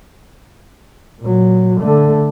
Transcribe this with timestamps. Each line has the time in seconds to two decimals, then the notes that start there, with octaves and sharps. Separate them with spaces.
1.21 A#2 F#3
1.80 D3 A3